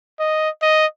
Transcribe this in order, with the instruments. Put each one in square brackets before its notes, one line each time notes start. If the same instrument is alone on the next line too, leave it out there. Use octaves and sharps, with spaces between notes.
[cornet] D#5
D#5